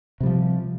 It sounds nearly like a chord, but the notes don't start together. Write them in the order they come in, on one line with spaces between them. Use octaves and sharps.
C3 G3 F3